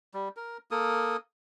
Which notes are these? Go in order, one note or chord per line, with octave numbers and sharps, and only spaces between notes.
G3
A#4
A#3 A4 A#4 D#6